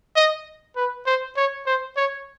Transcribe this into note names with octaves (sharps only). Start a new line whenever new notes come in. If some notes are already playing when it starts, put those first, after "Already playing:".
D#5
B4
C5
C#5
C5
C#5